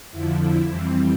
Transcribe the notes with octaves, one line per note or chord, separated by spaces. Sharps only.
F2 D3 F3 E4
E4
F2 E3 G3 C4